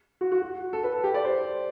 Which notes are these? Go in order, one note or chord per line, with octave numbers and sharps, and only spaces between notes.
F#4
F#4
F#4
A4
B4
A4
G4
D5
C5